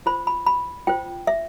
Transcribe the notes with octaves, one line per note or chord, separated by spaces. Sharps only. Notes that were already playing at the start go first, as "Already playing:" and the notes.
F4 C5 B5
B5
B5
F4 C5 G5
E5